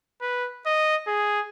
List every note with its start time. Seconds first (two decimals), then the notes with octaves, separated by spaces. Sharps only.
0.21 B4
0.66 D#5
1.07 G#4